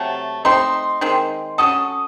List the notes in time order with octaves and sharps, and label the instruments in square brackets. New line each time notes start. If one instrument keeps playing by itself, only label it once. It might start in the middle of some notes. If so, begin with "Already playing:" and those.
Already playing: [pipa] C3 F#3 A3 [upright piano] A5
[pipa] A3 C4 D#4 [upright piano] C6
[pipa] D#3 G#3 C4
[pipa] F#3 C#4 F#4 A4 [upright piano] D#6